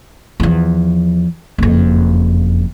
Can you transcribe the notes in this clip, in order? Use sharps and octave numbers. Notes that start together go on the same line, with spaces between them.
E2 F3
F#1 F2